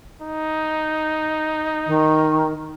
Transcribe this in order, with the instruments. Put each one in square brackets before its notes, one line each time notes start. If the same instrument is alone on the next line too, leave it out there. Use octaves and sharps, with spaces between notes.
[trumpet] D#4
[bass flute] D#3